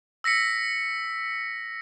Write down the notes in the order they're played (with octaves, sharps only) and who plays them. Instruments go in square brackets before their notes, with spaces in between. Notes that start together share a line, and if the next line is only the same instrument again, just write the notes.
[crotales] E6 A#6 B6 C#7